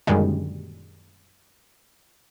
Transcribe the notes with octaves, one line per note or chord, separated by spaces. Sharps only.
F#2 A#2 D3 D#3 G3 G#3